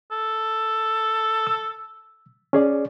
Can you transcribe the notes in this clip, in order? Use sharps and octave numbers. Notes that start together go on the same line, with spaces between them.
A4
E6
C#4 G#4 D5